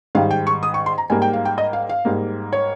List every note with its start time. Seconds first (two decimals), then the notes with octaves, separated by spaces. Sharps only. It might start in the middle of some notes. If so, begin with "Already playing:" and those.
0.15 G#2 D#3 G3 F5
0.31 G5
0.47 C#6
0.63 D#6
0.74 C#6
0.86 C6
0.98 A#5
1.10 G#2 G3 A#3 G#5
1.22 G5
1.33 F5
1.45 G5
1.58 D#5
1.73 F5
1.89 F5
2.05 G#2 G3 A#3
2.53 C#5